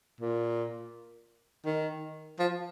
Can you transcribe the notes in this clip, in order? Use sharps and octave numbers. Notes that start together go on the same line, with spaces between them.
A#2
D#3
F3